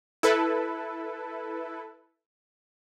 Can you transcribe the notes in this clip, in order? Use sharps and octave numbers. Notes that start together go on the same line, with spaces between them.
E4 A4 B4